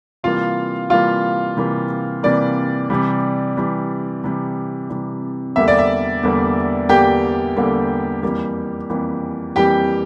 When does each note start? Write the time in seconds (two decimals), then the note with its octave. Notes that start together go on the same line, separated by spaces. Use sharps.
0.23 C3 E3 G3 A#3 F4 F5
0.90 C3 E3 G3 A#3 F4 F5
1.57 C3 E3 G3 A#3
2.23 C3 E3 G3 A#3 D5
2.90 C3 E3 G3
3.57 C3 E3 G3
4.24 C3 E3 G3
4.90 C3 E3 G3
5.56 E2 D3 G3 A#3 E5
5.68 D5
5.78 E5
6.23 E2 D3 G3 A#3
6.89 E2 D3 G3 A#3 G4 G5
7.57 E2 D3 G3 A#3
8.23 F2 E3 G3 A#3
8.90 F2 E3 G3 A#3
9.56 F2 E3 G3 A#3 G4 G5